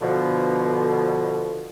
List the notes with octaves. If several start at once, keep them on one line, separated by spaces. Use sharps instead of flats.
B2 D3 F3